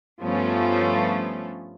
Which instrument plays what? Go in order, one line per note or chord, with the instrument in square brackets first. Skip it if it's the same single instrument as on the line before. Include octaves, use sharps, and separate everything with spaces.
[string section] G2 F3 A3 B3 C#4